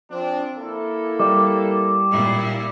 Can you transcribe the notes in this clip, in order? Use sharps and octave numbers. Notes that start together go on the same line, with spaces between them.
F3 C4 D4
A#3 E4 A4
G3 D6
A#2 E4